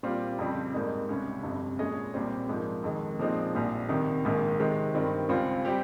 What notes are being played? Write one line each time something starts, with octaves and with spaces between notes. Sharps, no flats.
A#2 G3 C4 F4
F2 C#3 G3 C4 G4
G#2 G3 A#3 D#4
C#2 C3 G3 C#4
G1 F2 C3
A#2 G#3 C#4 G#4 D#5
C2 A#2 G3 C4
G#2 F3 A#3
F2 D#3 G#3
A#2 F3 G#3 C4 D#4
A#1 A#2 G3 C4
C2 C3 D#3
A#1 G#2 D#3 A#3
C3 D#3 G#3 C4
G2 D#3 G3 C4
C#2 C#3 G3 C4 F4
G3 C4 G4